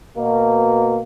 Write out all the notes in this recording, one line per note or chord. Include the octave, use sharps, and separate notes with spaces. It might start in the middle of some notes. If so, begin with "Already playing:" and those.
B2 A#3